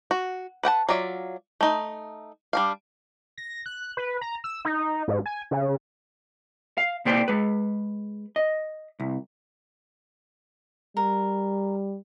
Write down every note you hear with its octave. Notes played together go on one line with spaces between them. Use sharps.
F#4
B4 F#5 G5 A5
F#3 F4 D5 E5
A3 D#4
G3 D4 F5
A#6
F#6
B4
A#5
E6
D#4
G#2
G#5
C#3
F5
B2 A#3 C5 D5 G5 C6
G#3 B4
D#5
C2
G3 A#4